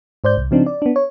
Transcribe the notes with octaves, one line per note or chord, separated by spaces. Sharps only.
G#2 C5 D5 G6
C2
C#3 F3 C4 D4 D#4
D5
B3 D4
C#5